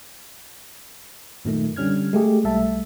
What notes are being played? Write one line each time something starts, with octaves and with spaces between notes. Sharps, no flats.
F#2 A#2 D#3 A3
D3 G3 C#4 F6 G#6
G#3 A3 G4 G#4
B1 G3 A3 E5 A5